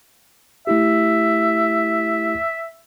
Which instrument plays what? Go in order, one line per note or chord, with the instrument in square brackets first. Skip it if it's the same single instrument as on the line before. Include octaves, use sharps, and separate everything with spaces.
[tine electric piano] A3 E4 G4 [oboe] E5